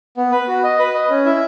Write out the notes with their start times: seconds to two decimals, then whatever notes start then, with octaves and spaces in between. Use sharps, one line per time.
0.17 B3
0.32 B4
0.48 F#4
0.63 D#5
0.79 B4
0.94 D#5
1.10 C#4
1.26 E4